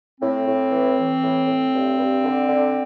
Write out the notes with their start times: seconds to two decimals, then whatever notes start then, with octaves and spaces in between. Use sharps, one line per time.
0.21 A2 C4
0.46 A2
0.72 E3
0.96 E3
1.21 A2
1.47 A2
1.73 G2
1.98 G2
2.22 D3
2.48 D3